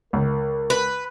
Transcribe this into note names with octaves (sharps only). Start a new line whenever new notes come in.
C#2 A#4
B4